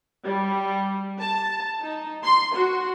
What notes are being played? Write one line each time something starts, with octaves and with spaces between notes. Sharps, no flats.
G3
A5
D#4
C6
F#4